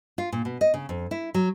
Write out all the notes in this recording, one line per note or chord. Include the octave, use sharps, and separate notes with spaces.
F4
A#2
B2
D#5
C#3
F2
E4
F#3